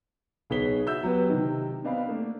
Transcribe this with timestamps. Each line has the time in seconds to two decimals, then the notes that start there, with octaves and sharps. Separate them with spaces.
0.50 B1 B3 G#4 C#5 B6 G7
0.87 F#4 E5 E6 G6
1.03 F#3 B3 G4 B4
1.29 C3 D#3
1.84 B3 C4 D4 D#4 F5 B5
2.08 A3 A#3 D4